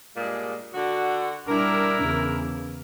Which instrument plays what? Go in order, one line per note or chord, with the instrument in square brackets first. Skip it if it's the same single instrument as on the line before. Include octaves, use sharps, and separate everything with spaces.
[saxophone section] G2 A#2 G#3
D3 F#4
[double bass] G3 D4 [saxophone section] E4 A#4
[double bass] E2 C#3